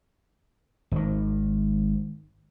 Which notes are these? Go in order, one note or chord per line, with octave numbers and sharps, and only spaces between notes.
G#1 D#3